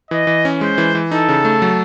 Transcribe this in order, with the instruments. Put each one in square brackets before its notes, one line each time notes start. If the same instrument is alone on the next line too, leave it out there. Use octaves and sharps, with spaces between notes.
[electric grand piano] E3 [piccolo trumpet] D#5
[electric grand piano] E3
C#4
[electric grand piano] G#3 [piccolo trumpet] C5
[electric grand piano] E3
E3
[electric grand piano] D#4 [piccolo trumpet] A4
[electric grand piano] C#3
A3
F#3